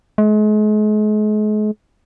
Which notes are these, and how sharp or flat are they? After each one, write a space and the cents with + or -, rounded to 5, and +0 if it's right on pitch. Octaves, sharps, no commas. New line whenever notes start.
G#3 +40